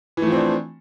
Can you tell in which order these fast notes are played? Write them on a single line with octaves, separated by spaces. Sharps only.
E3 A3 F3 C4 D4